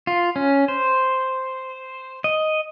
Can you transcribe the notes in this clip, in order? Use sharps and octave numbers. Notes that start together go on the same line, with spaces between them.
F4
C#4
C5
D#5